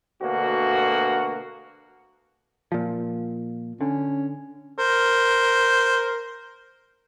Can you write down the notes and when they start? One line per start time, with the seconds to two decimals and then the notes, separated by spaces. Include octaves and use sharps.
0.22 D2 B2 D3 A#3 F#4
2.72 A#2 F3
3.81 D3 C#4
4.78 A#4 C5